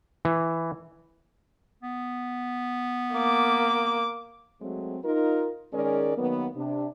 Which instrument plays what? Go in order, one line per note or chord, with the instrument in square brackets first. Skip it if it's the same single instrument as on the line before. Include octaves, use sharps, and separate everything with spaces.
[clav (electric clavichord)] E3
[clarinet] B3
[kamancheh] A#3 D6
[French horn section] F#3 G#3 A3 C4
D#4 F4 A#4
D#3 G#3 C#4 G#4 A#4 D5
D#3 F#3 A#3 B3
C3 D4